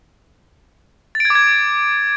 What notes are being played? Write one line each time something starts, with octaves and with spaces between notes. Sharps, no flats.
A6
D7
G#6
D6
G#6